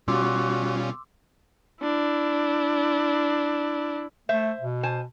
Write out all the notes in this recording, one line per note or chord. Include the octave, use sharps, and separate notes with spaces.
B2 G3 C#4 F4 F#4 C6 D6 E6
D4 E4
A3 C5 E5
B2
C5 G#5 A5